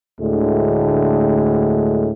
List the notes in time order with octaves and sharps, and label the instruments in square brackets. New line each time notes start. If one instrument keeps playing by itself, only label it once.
[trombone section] D2 A2 D3 G#3